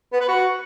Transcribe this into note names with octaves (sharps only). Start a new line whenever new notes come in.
B3
B4
F#4